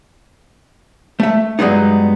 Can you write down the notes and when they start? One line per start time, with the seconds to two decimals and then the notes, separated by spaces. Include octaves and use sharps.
1.20 A3 E5
1.59 G2 F#3 G#3 B3 D#4